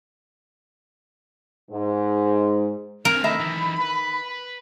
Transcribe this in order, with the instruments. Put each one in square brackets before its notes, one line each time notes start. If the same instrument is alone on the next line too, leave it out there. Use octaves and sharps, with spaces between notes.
[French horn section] G#2
[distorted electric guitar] C4 G#5 [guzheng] A#4
[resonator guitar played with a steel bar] D#3 E5 A#5 [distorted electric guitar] A3 C4 [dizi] B5
[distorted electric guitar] E3 D#4
B4